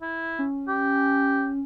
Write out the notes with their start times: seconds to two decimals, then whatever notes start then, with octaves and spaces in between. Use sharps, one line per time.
0.02 E4
0.39 C#4
0.68 G4